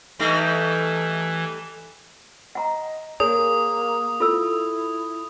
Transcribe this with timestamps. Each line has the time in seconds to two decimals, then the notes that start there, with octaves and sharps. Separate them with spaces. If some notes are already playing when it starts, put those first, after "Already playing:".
0.19 E3 G3 A3 D#4
2.55 D#5 F#5 A#5
3.20 A#3 G#4 A#4 C#5 D#6
4.20 E4 F4 A4 E6